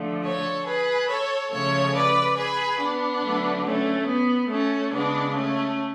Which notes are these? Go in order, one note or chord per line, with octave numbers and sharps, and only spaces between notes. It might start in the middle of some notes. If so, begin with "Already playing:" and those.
Already playing: D3 F3 A3
A4 C#5
G#4 B4
A4 C#5
C#3 F3 A3 A4 C#5
B4 D5
G#4 B4
B3 D4
D3 F#3 A3
A3 C#4
B3
A3 C#4
C#3 G#3 B3 D4
A3 C#4